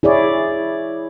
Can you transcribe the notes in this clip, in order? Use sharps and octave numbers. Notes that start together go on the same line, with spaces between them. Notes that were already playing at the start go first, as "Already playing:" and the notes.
E4 G#4 C#5 D5